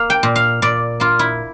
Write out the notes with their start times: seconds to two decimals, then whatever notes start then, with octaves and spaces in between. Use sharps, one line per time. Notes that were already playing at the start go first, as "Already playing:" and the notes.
Already playing: A#3 F5
0.10 G5
0.23 A#2
0.36 F5
0.62 A#2 D5
1.00 A#3 F4
1.19 E4